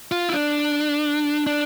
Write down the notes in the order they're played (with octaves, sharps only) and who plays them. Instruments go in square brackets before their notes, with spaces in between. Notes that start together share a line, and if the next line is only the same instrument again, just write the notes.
[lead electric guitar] F4
E4
D4
D4